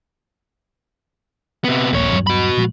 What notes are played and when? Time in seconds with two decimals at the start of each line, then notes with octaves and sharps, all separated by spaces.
1.64 C3 B3
1.93 D#1 A#1 F2 A#3 C#5
2.11 D#1 G2 F#3
2.27 F#4 B5
2.57 A#2 F3 G#3